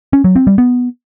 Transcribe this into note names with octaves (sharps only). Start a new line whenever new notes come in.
C#4
F#3
C4
G3
B3